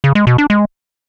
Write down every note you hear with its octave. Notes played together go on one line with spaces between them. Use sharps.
C#3
G#3
B2
D4
G#3